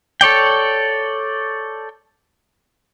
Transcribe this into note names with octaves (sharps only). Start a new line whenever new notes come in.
A4 C#5 D5 G5